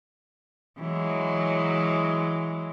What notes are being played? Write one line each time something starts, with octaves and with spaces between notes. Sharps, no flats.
E3 F#3 G#3